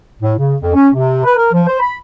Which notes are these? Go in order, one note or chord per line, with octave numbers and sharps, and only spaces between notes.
A2
C#3
F2
C#4
C3
B4
A#4
F3
C5
B5